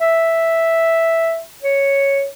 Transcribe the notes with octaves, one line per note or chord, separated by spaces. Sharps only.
E5
C#5